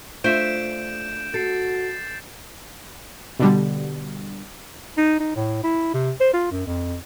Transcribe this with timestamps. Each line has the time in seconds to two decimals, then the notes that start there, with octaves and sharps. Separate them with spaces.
0.24 A3 D4 F4 C5 E5 G6 D7 E7
1.34 F#4 A4 A6 C7 D7
3.39 B2 D3 G3
4.97 D#4
5.20 D#4
5.35 A2
5.63 E4
5.94 C3
6.20 C5
6.33 F4
6.51 F#2
6.66 F2